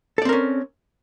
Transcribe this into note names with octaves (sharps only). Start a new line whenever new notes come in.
C4 C#4 A4 A#4 D5